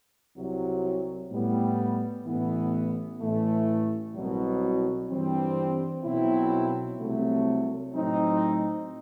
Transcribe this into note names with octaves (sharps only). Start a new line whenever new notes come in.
C2 C3 F#3
A2 G3 B3
A1 A2 E3 B3
A1 A2 E3 A3
C2 B2 F#3
G2 E3 G3 C4
B1 B2 F#3 C4 E4
C2 C3 F#3 A3
A2 F#3 C4 D#4